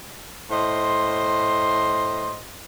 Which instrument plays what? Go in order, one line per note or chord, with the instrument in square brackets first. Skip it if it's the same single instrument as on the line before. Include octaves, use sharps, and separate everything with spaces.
[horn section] A2 C5 D#5 C6